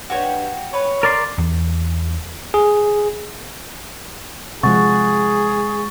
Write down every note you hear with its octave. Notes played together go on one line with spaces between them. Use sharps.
G2 F#4 G4 C#5
B4 C#5
A#4 D5 C6
E2
G#4
C3 F3 G#3 G#4 F#5 C#6 A6